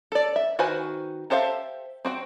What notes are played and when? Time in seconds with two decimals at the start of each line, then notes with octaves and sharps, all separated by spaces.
0.12 A4 D5
0.36 E5
0.59 D#3 F#4 B4 C5 G#5
1.30 G4 A4 C5 E5 F5
2.05 C4 F#4 G5